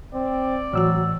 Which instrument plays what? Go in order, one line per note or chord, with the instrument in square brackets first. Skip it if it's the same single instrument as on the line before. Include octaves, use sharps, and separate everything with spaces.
[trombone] C4 [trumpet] D5
[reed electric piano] A2 E6 [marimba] E3 F#4 [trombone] F#3